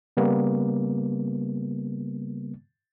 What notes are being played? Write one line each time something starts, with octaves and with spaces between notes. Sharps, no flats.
C#3 G3 A#3 B3